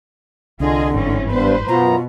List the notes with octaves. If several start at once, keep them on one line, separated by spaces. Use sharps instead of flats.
C2 D3 F4 G#4 D#5
G1 G#2 E3 C4 C#4
G2 B3 B4 C5
F#2 B2 B3 F4 A#5